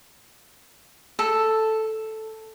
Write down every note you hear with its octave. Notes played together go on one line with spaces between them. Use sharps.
A4